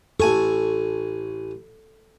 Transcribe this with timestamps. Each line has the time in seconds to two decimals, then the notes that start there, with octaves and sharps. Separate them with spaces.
0.20 A1 A4 G#5 C#6